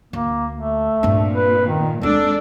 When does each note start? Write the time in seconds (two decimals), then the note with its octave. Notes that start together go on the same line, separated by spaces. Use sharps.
0.13 D2 A#3
0.55 A3
1.03 G2 A#2 C4
1.35 B4
1.67 D#3
2.02 D#2 G#3 C4 D4 A4